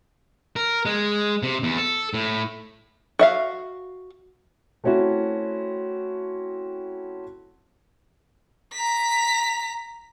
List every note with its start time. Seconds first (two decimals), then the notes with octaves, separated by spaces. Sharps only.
0.56 A#4
0.85 G#3
1.43 C3
1.63 E2
1.77 A4
2.14 A2
3.19 F#4 E5 F5
4.84 A3 C4 C#4 E4 F#4
8.73 A#5 B6